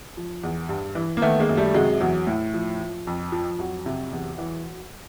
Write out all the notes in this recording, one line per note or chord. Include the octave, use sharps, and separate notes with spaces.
F3
E2
G2
E3
A#3
D#3 A3 B3
G#3 A#3
F#2
G3 A3
C3 F#3 G#3
E2 F#3
A2
F3
F3
F2
F3
F2 F#3
C3
E2
E3